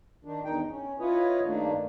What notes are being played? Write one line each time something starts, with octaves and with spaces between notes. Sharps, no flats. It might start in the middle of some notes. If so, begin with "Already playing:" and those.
D#3 D4
E2 G2 D#4 G5
C#4
E4 F4 B4 C#5 D#5
G2 D#3 A3 A#3 D4